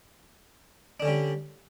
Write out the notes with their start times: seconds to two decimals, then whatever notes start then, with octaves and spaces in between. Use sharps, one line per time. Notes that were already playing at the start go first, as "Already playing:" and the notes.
1.00 D4
1.02 D3
1.05 C#4
1.07 G3